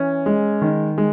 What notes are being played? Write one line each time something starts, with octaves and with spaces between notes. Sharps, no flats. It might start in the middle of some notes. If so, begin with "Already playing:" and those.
Already playing: E3 C#4
G#3
D#3
G#3